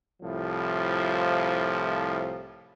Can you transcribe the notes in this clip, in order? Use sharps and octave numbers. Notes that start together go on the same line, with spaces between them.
C2 A2 F3